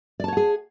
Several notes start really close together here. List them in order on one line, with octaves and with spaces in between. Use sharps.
D5 A5 C#5 F#5 G#4